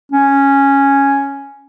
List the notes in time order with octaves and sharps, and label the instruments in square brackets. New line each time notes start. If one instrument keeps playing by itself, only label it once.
[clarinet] C#4